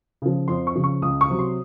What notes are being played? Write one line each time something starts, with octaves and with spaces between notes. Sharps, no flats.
C#3 F3
F2 C6
C#6
C#3 F3
C#6
C#2 D#6
C#6
C3 F#3
C6